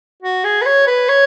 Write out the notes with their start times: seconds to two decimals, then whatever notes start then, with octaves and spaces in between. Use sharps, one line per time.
0.23 F#4
0.44 G#4
0.62 B4
0.66 C#5
0.88 B4
1.09 C#5